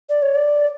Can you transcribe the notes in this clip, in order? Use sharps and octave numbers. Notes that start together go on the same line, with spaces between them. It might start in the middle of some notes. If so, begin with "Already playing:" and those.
D5
C#5
D5